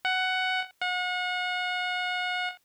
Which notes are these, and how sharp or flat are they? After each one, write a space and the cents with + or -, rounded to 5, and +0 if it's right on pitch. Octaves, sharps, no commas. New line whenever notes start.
F#5 +10
F#5 -35